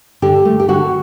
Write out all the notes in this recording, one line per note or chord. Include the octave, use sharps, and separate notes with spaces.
D3 G4
A3
G4
D3 F#4